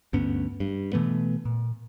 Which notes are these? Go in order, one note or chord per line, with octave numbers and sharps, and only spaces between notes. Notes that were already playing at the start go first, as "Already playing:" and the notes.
D2 G2 B3 C#4
G2
B2 E3 A3 B3
A#2